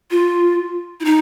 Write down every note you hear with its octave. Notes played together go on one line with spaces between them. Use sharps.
F4
E4
D#4